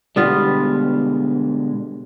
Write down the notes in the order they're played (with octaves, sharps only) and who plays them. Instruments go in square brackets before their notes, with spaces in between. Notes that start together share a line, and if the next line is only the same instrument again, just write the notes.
[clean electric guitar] B2 D3 G#3 [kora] G3 B3 F4